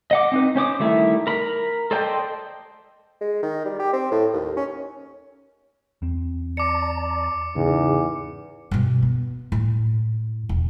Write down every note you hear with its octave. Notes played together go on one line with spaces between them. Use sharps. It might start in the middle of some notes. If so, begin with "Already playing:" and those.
D#5 F#5 D6
C4 D#4 B4
C#4 C5 D6 D#6
D#3 G3 A3 E4
A#4 B5
A4 C5 D5 D#5 G5
G#3
D#3
G3
G4
C4
A2
D#2
C#4
E2 C4
D5 A5 A#5 D6 C#7
E2 G#2 C#3 C#4 D#4 G#4
G2 B2
B3
A2
E1